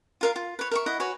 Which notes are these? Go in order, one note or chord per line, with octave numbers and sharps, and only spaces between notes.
F4 A#4 F5
F4
B4 C#5
A#4 E5 C#6
E4 D#5 F#5
F#4 B4 C#5 G#5